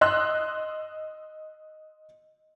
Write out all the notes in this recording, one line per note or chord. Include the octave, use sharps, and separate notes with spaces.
D#5 C6 E6 F#6